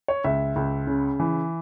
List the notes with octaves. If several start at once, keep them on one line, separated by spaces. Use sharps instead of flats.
C#5
C#2 E5
C#2
C#3
E3